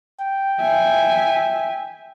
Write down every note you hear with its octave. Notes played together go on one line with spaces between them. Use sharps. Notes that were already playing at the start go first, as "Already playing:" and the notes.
G5
E5 G#5